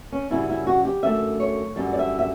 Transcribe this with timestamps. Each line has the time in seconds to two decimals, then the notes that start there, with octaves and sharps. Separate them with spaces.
0.12 C#4
0.30 F#2 C#3 G3 E4
0.49 E4
0.67 F#4
0.85 G4
1.03 F#2 D3 A3 E5
1.40 C#5
1.76 F#2 D3 G3
1.93 D5
1.99 E5
2.19 E5